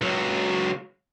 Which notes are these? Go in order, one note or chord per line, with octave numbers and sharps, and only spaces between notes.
C#2 F#3